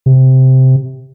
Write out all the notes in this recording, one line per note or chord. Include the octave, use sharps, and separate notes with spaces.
C3